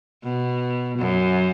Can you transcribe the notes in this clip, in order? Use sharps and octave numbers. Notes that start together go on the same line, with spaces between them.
B2
F#2